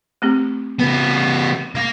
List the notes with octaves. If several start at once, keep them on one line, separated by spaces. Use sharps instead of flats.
A3 C4 G4
C#3 B3
A#3 F5